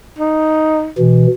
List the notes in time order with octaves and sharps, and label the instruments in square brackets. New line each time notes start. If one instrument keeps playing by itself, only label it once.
[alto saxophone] D#4
[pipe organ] B2 E3